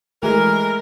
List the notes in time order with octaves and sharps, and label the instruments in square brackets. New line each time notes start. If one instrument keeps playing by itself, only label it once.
[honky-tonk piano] E3 G#3 [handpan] A3 [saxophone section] A#4